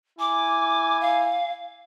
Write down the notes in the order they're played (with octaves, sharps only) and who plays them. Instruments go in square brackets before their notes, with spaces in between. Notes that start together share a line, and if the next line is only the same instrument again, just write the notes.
[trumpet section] E4 G#5 [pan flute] D6
[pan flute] F5